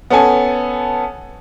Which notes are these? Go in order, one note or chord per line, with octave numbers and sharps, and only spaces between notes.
B3 C#4 A4 G#5